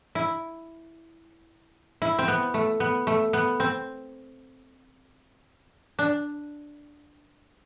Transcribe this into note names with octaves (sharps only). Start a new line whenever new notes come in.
E4
E4
C4
B3
A3
B3
A3
B3
C4
D4